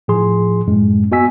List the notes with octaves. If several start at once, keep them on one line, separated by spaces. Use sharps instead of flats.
A2 F3 G#4 C6
F#2 A2 G#3
B3 F#4 D#5 G#5 E6 B6